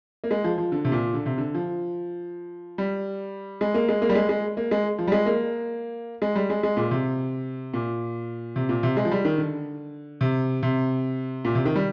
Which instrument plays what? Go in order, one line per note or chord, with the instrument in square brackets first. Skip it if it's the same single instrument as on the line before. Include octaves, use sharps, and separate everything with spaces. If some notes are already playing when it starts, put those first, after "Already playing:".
[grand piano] A#3
G#3
F3
F3
D3
C3
A#2
D3
C3
D3
F3
G3
G#3
A#3
G#3
A#3
G3
G#3
G#3
A#3
G#3
F3
G3
G#3
A#3
G#3
G3
G#3
G#3
A#2
C3
A#2
C3
A#2
C3
G#3
F3
G3
D#3
D3
C3
C3
A#2
C3
D#3
G3